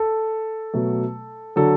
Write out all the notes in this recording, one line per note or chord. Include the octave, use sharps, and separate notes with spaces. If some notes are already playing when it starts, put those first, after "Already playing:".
Already playing: A4
B2 F#3 A3
D3 F#3 A4